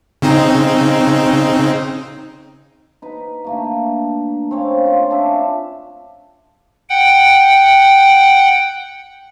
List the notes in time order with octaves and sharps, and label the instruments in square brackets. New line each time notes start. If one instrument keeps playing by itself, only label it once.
[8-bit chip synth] C#3 C4 D#4
[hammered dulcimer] D#4 B4
D3 A3 A#3
C4 C#4 C#5 F5
F4
D4 E5
[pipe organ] F#5 G5